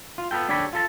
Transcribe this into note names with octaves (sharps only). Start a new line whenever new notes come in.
F4
B3 F4 A4 G5
D#2 D4 G4 A4 C#5 B5
F4 A4 A5